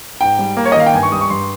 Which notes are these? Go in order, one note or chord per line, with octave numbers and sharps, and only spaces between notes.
G#2 G5
G3
A#3
C#5
D#5
D#3
F5
G5
G2 G#5
C#6
G3 D#6
C#6
G2 C6